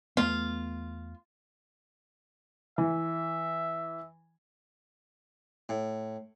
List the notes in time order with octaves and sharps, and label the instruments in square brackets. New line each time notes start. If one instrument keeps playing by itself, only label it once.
[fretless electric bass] E2 A3 B3 [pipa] F4
[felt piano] E3 [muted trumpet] E5
[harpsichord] A2